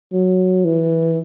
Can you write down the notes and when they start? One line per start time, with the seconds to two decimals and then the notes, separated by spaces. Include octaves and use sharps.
0.13 F#3
0.65 E3